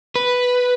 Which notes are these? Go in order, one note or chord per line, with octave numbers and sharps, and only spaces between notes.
B4